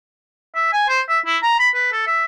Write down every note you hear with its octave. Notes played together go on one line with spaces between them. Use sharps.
E5
G#5
C5
E5
E4
A#5
B5
B4
A4
E5